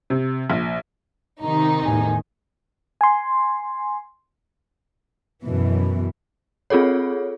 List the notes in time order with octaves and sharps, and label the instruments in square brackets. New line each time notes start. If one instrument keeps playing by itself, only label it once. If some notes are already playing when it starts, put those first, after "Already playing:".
[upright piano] C3
A#1
[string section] C3 D#3 D#4 [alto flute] A#5
[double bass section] E2 A2 [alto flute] G#5
[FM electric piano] G#5 C6
[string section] F#2 B2 E3
[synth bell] C4 F4 G#4 A4 C#5